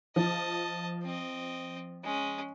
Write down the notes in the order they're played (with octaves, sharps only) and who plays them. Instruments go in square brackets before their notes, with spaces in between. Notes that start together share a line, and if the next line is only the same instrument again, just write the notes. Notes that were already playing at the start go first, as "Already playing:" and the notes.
[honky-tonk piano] F3 [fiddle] D#5 A5
[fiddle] C4 D#5
G#3 C#4